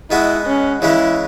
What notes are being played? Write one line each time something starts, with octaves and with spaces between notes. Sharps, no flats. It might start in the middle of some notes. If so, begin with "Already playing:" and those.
B2 G#3 B3 E4 F#4
C#4
C#3 E3 G#3 C#4 E4